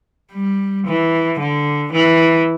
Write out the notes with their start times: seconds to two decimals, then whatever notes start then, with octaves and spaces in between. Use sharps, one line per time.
0.32 G3
0.86 E3
1.39 D3
1.92 E3